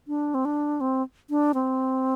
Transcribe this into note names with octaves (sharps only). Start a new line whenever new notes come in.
D4
C4
D4
C4
D4
C4